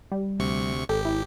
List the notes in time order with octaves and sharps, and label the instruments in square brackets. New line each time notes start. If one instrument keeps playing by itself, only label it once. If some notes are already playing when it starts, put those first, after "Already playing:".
[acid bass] G3
[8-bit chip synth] D2 C3 C#6
[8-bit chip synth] G#1 G4 [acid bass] A4
[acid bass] E4